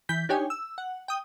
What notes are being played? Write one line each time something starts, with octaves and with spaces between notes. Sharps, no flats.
E3 G6 B6
D4 D#4 G4 C#5 G5 G#5
E6
F#5
G5 D#6